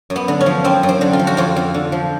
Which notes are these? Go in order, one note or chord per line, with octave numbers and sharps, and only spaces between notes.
F#2
B3
D3
C#4
F3
F#2 C4
F#2
C4
D3
F4
F3
F#4
F2 F4
F2
D3
F3